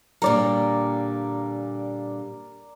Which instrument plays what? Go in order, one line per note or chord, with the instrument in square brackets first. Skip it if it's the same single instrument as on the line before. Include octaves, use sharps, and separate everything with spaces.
[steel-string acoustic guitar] A#2 D3 G3 [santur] A#4 D5